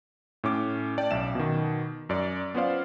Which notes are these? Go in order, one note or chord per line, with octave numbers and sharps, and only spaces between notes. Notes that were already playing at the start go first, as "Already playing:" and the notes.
A2 C#4 D6
D5 G5 A5
B1 C#4 E5 E7
B2 D#3
F#2 D5
B3 C#4 F4 C5 D5 F5